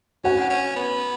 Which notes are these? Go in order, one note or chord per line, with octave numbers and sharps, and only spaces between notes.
C#4 F#4 F#5
C#4
B3